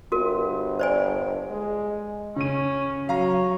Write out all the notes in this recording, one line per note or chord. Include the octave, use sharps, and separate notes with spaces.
G1 F#4 A#4
C5 D5 G#5
G#3
C#3 C#4 D#7
F#3 C#5 F5 A#5